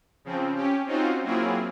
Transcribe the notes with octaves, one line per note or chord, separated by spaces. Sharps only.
C#3 F3 C4
C#4 G4
C4 C#4 D#4 F4 F#4 C5
F#3 A#3 C4 E4 F4 G#4